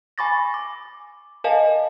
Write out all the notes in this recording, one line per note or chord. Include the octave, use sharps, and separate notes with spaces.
G#5 B5 C#6 D6 A6 A#6
D6
A#4 D#5 F5 G#5 A5